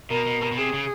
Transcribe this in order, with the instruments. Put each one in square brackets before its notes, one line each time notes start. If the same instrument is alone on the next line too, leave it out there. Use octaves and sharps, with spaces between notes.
[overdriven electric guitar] B2 [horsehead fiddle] A#4
[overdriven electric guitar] B2
B2
B2
[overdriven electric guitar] C3 [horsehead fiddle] G#4
[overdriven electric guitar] C#3